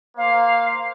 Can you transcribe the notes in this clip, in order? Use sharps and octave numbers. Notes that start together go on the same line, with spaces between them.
A#3 C5 F5